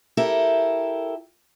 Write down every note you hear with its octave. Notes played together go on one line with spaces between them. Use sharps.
E4 G4 A4 A#4